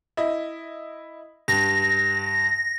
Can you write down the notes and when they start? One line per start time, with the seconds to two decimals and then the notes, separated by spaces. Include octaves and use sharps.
0.17 E4 D#5
1.48 G2 A#6